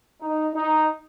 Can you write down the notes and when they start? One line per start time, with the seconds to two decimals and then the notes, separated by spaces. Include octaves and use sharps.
0.21 D#4
0.55 D#4